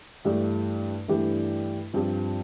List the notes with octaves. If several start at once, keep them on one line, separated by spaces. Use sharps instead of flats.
G2 E3 A3 D4 G4
G2 E3 A3 D4 G4
G2 F3 C4 G4